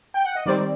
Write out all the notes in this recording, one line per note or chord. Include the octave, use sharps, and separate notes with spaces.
G5
F#5
D#5
D#3 G3 C4 D5